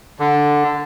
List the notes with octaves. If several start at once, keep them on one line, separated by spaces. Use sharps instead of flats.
D3